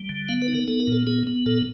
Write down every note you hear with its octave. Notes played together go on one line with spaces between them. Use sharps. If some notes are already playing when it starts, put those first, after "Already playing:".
Already playing: G3
D3
B3 F5
B4
D#4
A#4
B3 A4
A#4
A#2 A4
B3 G#4
B3
A#2 A4